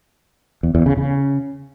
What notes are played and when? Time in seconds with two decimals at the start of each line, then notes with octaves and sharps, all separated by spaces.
0.63 E2
0.75 E2
0.86 C#3
0.97 C#3